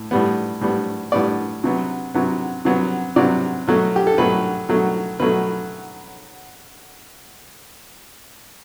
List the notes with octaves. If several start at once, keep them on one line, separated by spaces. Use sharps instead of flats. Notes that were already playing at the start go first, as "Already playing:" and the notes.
Already playing: A2
A2 G3 B3
A2 G3 B3
A2 G3 B3 D5
C3 F#3 B3
C3 F#3 B3
C3 F#3 B3
C3 F#3 B3 D5
B2 F#3 A3
G4
A4
B2 F#3 A3 B4
B2 F#3 A3
B2 F#3 A3 B4